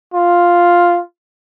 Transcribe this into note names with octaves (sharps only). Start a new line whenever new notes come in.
F4